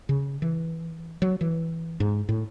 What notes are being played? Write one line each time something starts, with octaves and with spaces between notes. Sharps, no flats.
C#3
E3
F#3
E3
G#2
A2